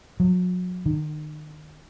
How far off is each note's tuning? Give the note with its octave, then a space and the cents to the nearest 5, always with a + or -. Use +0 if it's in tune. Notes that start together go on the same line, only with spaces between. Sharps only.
F#3 -35
D#3 -35